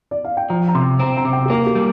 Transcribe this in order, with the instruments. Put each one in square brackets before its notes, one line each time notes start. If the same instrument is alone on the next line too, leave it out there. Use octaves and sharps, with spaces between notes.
[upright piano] D5
F5
G5
[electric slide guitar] F3 [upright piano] A#5
[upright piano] A#5
[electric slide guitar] C3 [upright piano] C6
[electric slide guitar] C4 [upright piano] A#5
[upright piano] A#5
[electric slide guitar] C3
[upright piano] G5
G4
[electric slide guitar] A#3 [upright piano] A#4
[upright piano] G4
[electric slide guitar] G3